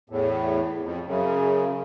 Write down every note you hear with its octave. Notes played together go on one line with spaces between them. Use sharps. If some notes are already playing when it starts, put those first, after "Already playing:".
E2 A2
F2
F#2 C#3